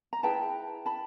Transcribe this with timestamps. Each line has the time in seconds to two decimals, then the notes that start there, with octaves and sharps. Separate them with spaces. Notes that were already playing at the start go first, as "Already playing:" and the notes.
0.13 A#5
0.23 E4 G#4 B4 G5 A5
0.86 A5 B5